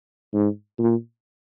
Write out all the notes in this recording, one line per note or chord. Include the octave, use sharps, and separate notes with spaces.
G#2
A#2